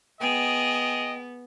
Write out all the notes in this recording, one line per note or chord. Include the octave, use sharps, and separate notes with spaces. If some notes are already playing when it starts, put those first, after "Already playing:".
B3 G#4 D#5 G5